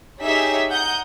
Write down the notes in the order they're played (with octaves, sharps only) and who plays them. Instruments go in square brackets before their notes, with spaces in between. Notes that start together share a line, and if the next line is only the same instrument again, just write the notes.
[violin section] D#4 G4 G#4 C#5 E5 B6
F#5 A#5 D#6 G6